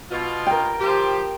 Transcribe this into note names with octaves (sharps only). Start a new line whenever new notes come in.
B2 F4
A#4 G5
F3 G4 C5